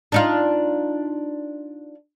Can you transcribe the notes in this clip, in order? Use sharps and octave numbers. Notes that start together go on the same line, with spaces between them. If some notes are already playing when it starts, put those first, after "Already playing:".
D4 D#4 F4